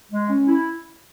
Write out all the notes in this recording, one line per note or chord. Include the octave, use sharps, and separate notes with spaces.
G#3
C#4
E4